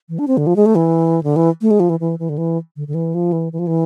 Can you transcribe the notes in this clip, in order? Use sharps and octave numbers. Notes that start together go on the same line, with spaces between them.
E3
D4
C4
D3
F3
G#3
A3
E3
D3
E3
A3
G#3
F3
E3
E3
E3
D3
E3
D3
D3
E3
F3
E3
E3
F3
E3